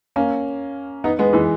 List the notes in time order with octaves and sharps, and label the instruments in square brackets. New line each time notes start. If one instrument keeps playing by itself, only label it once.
[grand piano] A#3 C#4
B3 D#4
G#3 B3
E3 G#3